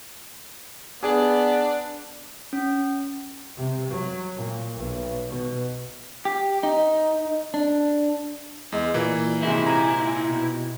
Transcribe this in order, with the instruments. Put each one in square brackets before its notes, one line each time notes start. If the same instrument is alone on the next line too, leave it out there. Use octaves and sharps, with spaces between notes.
[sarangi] B3 [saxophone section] D4 D5 [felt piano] G#4
[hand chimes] C#4
[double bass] C3
F#3
A#2
B1
B2
[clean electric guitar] G4
D#4
D4
[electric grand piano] E2 [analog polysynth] G#3
[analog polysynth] A#2 [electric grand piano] E3 A#3
[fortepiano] G#2 C3 [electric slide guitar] E4
[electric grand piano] A#2 A#5 [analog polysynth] G#5
[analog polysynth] B2